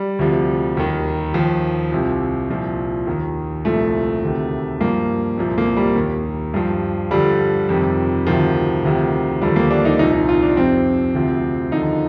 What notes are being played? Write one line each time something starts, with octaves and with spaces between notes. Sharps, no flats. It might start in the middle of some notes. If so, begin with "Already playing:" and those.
Already playing: G3
D2 C3 F3
D#2 D#3
D#2 D#3 F3
C2 C3 F3
C2 A#2 F3
D#2 D#3
C2 A#2 F3 A3
D2 C3 D#3
G2 F3 A#3
C2 A#2 F3
A#3
G3
D#2 D#3
G2 F3
G2 D3 F3 G3
F2 C3 D#3
D2 C3 D#3 F3
D2 C3 D#3
D#2 D3 F3 G3
A#3
D4
D#4
C2 A#2 F3 D#4
D#4
F4
D4
F2 C3 F3 C4
D2 C3 F3
D#2 D3 F3 D#4